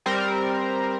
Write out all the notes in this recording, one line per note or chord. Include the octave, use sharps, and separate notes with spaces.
G3 C4 A#4